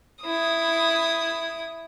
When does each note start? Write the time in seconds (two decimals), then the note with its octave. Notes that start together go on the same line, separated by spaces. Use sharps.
0.24 E4 D#6